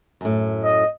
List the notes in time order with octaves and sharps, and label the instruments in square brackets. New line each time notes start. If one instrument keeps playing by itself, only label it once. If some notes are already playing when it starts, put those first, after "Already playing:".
[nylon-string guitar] F#2 A2
[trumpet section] D#5